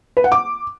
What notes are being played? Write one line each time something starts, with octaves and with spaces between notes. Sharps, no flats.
B4
F#5
D6